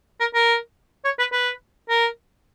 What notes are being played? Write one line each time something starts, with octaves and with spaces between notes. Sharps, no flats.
A#4
A#4
C#5
B4
B4
A#4